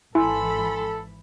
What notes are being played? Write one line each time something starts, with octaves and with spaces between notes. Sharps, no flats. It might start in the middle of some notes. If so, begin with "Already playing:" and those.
G#1 E3 E4 A4 G#5 B5 C6 E6